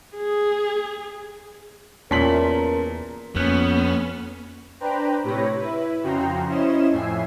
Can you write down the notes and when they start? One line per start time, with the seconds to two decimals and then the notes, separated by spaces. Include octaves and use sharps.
0.17 G#4
2.11 E2 A#2 C#4 A#4 A5 C6 B6 F#7
3.36 F2 A#3 B3 C#4
4.80 D4 B4 C5 G5 A#5 B5
5.24 A2 C3 G4 B4 C#5 A#6
5.57 E4 B4
6.02 F2 C#3 F#4 G5 A#5 C6
6.47 C#4 E4 C5 D#5 E7
6.91 F2 A2 E5 G#5 C7